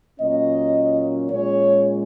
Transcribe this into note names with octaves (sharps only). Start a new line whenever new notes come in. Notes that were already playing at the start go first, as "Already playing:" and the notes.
A#2 F#3 A#3 C#4 D#5
A#2 G#3 C#4 C#5